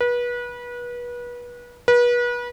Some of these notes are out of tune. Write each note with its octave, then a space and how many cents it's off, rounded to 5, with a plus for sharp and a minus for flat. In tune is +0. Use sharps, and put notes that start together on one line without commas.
B4 -30
B4 -35